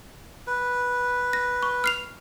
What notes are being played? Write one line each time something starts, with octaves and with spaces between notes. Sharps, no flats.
B4
A#6
C#6
F6 C7 F7